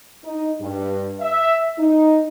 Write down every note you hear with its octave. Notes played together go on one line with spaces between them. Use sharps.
D#4
G2
E5
D#4